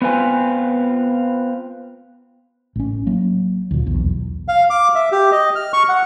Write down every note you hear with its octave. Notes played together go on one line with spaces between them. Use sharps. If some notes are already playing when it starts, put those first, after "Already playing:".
B3 C4 F4 B4 G#5
A1 C#4
F#3 A#3
D2 A#2
B1 E2
F5
D6
E5
G4
D#5
F6
C#6
F#5